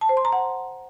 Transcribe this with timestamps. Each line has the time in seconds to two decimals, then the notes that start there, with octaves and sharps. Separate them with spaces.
0.01 A5
0.09 C5
0.17 C6
0.25 A#5
0.33 F#5